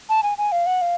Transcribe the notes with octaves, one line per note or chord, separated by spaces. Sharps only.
A5
G#5
G#5
F5
F#5
F5